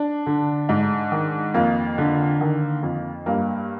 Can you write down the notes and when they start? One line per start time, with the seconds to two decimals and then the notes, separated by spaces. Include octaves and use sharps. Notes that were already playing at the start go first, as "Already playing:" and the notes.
Already playing: D4
0.26 D3
0.69 G#2
1.12 D#3
1.54 F2 A#3
1.98 D3
2.41 D#3
2.82 F2
3.26 G2 A#3